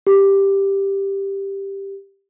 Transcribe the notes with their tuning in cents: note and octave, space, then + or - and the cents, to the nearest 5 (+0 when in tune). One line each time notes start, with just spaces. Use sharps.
G4 +5